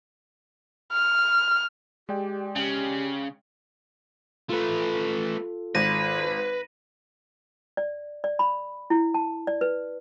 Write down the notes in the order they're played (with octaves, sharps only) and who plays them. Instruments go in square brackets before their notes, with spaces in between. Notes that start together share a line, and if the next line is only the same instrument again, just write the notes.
[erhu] F6
[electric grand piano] G#3 D5 G5 [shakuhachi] G4
[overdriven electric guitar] C#3 [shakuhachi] G4
[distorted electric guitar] A3 B4 [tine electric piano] F4 A4
[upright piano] G#1 [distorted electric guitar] B4 [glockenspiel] A#6 D#7
[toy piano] D5
D5
B5
E4
A5
D5
B4